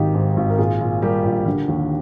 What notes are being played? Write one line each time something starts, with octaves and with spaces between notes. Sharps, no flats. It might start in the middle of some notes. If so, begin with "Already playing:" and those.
Already playing: G#1 D#3 D#4 G4
G#2
G#1
A#4
A#2 F4 G#4
A#2
G3 G4 A#4
A#1
D3
D#2